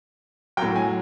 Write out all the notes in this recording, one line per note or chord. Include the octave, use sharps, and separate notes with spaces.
A2 F#3 G5
G#5